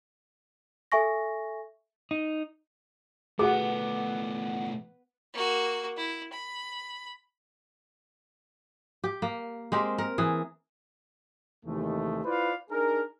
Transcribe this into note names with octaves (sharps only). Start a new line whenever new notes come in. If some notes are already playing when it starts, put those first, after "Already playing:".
A4 E5 G#5 C#6 A#6
D#4
B2 A3 B3 F#4 G#4 F#5 D6
A#3 F#4
E4
B5
G4
A#3
G#3 C4 G4 A#4
A#4
E3 G#4
D#2 C3 E3 G#3 A3
E4 F4 B4 C5 D5 F5
D4 D#4 G#4 A#4